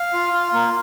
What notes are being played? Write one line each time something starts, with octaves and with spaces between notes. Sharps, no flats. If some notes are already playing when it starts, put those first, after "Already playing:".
Already playing: F5
F4
F4
A#3